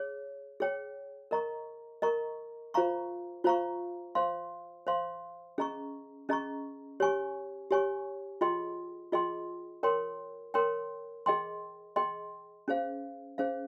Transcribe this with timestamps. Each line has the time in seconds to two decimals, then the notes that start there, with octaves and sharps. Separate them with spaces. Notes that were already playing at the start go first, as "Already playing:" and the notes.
Already playing: G#4 C#5
0.60 G#4 C#5 G5
1.31 A#4 D#5 A#5 C#6
2.02 A#4 D#5 A#5 C#6
2.74 F4 C5 F5 A#5 C#6
3.44 F4 C5 F5 A#5 C#6
4.15 C5 F5 C6
4.87 C5 F5 C6
5.58 C#4 G#4 D#5 A#5 C#6
6.29 C#4 G#4 D#5 A#5 C#6
7.00 G4 C#5 G#5 C#6
7.71 G4 C#5 G#5 C#6
8.41 F4 G#4 D#5 G5 C6
9.12 F4 G#4 D#5 G5 C6
9.83 A#4 C#5 G5 C6
10.54 A#4 C#5 G5 C6
11.26 G#4 D#5 G5 C6
11.96 G#4 D#5 G5 C6
12.68 C#4 G#4 C5 F5
13.38 C#4 G#4 C5 F5